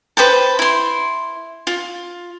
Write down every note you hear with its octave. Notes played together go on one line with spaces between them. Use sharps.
B4 C5 G5 A5
E4 C6
F4